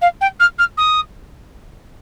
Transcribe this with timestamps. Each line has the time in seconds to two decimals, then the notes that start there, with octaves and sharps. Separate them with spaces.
0.01 F5
0.21 G5
0.39 F6
0.58 F6
0.77 D#6